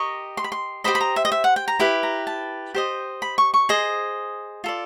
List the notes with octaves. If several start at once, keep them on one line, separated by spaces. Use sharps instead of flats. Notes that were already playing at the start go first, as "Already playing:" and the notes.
Already playing: G4 A#4 D#5 C#6
C6
B5
C6
G4 C5 D#5 B5
B5
A#5
E5
D#5
E5
F#5
G5
A#5
E4 G4 B4 B5
A#5
A5
G4 C5 D#5
B5
C#6
C#6
G#4 C5 D#5
F4 A4 D5